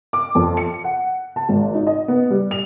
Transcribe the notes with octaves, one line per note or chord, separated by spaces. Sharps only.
D6
F2
C#7
F#5
A5
G#1
D#4
D#5
B3
G3
F7